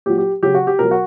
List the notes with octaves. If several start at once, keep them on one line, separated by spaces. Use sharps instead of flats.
A#2 F#3 G4
G4
C#3 F#3 G4
F#4
G4
B2 F#3 A#4
F#4